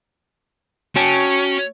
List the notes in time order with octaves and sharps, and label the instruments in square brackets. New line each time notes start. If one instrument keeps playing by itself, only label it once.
[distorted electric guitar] C#4 [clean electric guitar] F#4 G5 A5